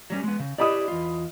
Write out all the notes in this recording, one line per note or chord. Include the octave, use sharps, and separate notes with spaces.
F#3 G3 C#4
G#3 B3
C#3
E4 G4 D5 D#5 B5 D#6
E2 F4